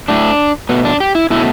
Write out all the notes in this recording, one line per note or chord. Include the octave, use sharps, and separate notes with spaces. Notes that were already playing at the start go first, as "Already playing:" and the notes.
A2 A3 D4
B2 A3 B3
D4
G4
E4
B2 A3 E4